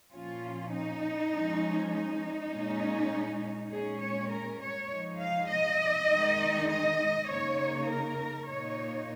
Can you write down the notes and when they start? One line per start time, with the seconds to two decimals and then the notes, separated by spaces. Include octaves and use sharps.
0.11 A#2 F3 C#4 F4
0.71 D#4
1.32 F3 G#3 C#4
1.91 D#4
2.50 A#2 G#3 C#4
3.70 A#2 G#3 C#4 G#4
4.00 C#5
4.30 A#4
4.60 C#5
4.90 F3 G#3 D#4
5.20 F5
5.49 D#5
6.09 D#3 G#3 D#4
6.69 D#5
7.29 C#3 A#3 D#4 C#5
7.89 A#4
8.48 A#2 A#3 D#4 C#5